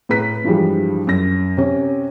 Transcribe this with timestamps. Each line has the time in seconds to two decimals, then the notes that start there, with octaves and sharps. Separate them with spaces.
0.09 A2 G#4 B4 A#5 B6
0.44 G2 E3 F3 G3 G#3
1.07 F#2 A#6
1.57 C3 C#4